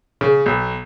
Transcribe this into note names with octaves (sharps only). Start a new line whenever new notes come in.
C#3
B1